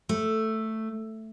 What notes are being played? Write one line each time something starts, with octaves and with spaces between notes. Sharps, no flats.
A3